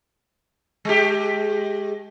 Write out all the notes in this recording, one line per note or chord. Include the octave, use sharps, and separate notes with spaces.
G#3 G4